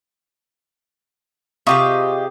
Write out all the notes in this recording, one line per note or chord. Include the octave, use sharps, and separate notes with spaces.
C3 F4 G4 G#4 D#5 C#6